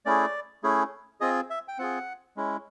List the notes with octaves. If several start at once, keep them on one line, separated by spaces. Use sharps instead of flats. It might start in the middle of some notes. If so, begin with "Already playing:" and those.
A3 C#4 E4 G#4 D5
A3 C#4 E4 G#4
C4 F4 G#4 D#5
E5
G5
C4 F4 G#4 F#5
G#3 C#4 E4